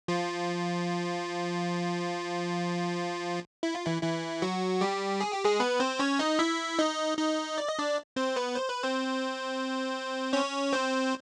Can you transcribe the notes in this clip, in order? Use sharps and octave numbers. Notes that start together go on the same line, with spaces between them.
F3 F4
E4
F4
E3 E4
E3 E4
F#3 F#4
G3 G4
G#4
G4
G#3 G#4
B3 B4
C4 C5
C#4 C#5
D#4 D#5
E4 E5
D#4 D#5
D#4 D#5
D5
D#5
D4 D5
C4 C5
B3 B4
C5
B4
C4 C5
C#4 C#5
C4 C5